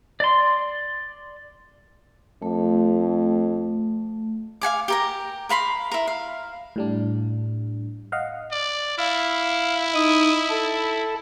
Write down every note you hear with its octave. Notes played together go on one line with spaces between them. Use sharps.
D5 C6
F2 A3
F5 F#5 G#5 D6
G4 A#4 A#5
A#4 F5 B5 C6
E4 A#4
F5
A2 G3 D4
D#5 F5 F#5
D5
E4 F5
D#4 D#6
A4